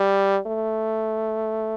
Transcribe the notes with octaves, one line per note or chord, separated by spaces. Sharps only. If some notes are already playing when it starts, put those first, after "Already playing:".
Already playing: G3
A3